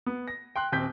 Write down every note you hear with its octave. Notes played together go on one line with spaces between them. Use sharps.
B3
A#6
G5 C6 F#6
D#1 C4 G6 B6